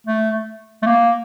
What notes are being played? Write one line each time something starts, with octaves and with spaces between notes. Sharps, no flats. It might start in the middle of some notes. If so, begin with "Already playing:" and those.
A3
A3
A#3